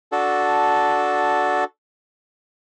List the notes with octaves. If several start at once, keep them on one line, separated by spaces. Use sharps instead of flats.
D4 F#4 A4